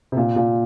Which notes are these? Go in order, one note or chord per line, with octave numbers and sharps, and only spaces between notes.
C3
A#2
A#2